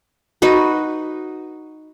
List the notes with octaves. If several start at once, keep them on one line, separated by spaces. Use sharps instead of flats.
D#4 F#4 B4